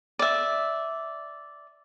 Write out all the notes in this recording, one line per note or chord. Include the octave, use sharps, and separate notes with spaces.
D5 E5